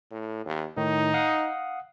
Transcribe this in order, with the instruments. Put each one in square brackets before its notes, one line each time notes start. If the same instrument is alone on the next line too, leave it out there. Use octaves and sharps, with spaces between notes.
[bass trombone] A2
D#2
[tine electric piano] A2 D#3 [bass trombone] D#4
[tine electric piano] F5 F#5 D#6